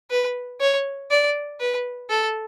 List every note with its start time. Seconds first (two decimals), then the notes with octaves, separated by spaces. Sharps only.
0.10 B4
0.60 C#5
1.11 D5
1.60 B4
2.10 A4